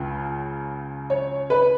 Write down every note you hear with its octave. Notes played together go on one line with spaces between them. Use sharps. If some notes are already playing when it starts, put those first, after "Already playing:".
Already playing: C#2 C#3
C#5
B4